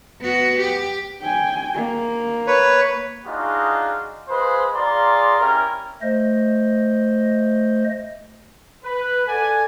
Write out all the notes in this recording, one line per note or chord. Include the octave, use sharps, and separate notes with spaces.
B3 F#4
G4
G5 G#5
A#3
B4 C#5
D4 D#4 F4 F#4 G#4
G#3 F4 B4 C5 G#5 C6
A#3 F4 G#4 D5 A#5 C6
C#4 E4 G4 A#4
A3 C5 D#5
B4
A4 D5 F#5 G#5